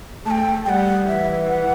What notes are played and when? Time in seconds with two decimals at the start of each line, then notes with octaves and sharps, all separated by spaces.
0.25 A3 A5
0.31 G5
0.66 G3 F#5 G5
1.07 E3 E5
1.48 F#5